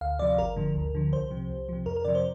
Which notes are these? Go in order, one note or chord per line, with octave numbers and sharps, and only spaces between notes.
D2 F5
C3 F3 D5
G1 A#4
G2 D3 F3
D2
D3 F3
C2 C5
C3 F3
C2
C3 F3
F2 A#4
A#4
C3 F3 D5
C5